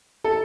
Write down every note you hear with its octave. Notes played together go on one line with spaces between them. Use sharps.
A4